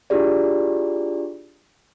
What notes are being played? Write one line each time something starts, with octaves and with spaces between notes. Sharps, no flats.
D4 E4 F4 G4 G#4 D5